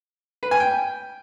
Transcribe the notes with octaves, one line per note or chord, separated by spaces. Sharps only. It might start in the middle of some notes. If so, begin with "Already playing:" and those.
B4
G#5
G5